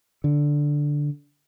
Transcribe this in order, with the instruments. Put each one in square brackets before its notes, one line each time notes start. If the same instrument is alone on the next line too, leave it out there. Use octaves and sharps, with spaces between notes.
[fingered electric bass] D3